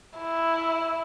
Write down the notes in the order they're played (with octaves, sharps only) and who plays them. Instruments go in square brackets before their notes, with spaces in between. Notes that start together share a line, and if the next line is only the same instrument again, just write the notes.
[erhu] E4